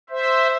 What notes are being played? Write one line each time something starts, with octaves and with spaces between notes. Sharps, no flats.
C5 E5